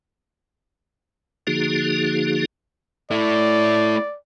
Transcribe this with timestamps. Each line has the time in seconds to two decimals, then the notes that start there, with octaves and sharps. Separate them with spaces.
1.47 D3 F3 A#3 D#4 F#4 G#4
3.11 A3 E4 D5